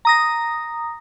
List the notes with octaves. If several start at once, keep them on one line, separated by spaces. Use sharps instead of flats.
A#5 D#6 A#6